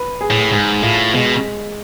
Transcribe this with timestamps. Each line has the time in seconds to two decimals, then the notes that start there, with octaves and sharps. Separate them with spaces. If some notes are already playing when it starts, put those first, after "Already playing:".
Already playing: B4
0.21 G#4
0.30 A2
0.52 G#2 G#4
0.83 A2 F4
1.14 B2 G#3